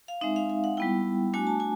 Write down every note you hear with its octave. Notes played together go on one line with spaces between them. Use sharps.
F5
G#3 C4 D#4 E5
F5
F5
F#5
G3 B3 E4 G5
A3 D4 F#4 G#5
A5
G#5